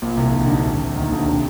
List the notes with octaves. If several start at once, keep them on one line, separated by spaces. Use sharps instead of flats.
A#1 A#2
C2 C3
D3
D#3
D2 D3
D#2 D#3
D2 D3
C3